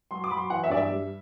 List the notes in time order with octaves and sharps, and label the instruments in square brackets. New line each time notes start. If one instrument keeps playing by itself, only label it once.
[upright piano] F#3 C6
D6
F#3 B5
C6
E3 F#5
E5
G2 D5
E5
G3